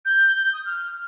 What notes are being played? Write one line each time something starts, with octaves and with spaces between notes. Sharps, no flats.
G6
D#6
F6